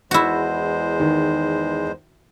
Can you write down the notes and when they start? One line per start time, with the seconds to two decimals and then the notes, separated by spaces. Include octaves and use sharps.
0.11 E2 G#3 E4 F#4 C5
1.00 D#3